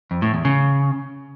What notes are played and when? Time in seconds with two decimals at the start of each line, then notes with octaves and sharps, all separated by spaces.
0.11 F2
0.22 A2
0.33 E2
0.45 C#3